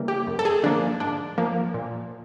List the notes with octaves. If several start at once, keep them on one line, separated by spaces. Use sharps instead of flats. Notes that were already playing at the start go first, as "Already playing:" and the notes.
Already playing: C#3 E3 G3 A#3
G4
F#2
A4
G#4
D3 F3 A#3 D4
G#2 D4
F3 A#3
A#2